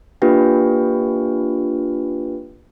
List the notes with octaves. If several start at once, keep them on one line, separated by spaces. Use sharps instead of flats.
A#3 D4 F4 G4 B4 G5